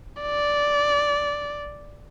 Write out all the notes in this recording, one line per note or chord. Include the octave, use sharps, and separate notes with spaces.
D5